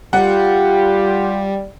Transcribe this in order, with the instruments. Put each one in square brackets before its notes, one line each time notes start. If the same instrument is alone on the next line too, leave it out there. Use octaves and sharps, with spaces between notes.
[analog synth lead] G3 [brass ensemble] F4 G4 [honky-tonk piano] F#5